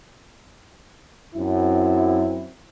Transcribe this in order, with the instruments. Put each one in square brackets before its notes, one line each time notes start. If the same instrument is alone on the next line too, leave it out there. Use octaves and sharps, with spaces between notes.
[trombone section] F#2 C4 E4